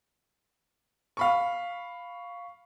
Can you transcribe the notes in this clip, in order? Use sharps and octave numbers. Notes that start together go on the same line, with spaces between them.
F5 B5 C#6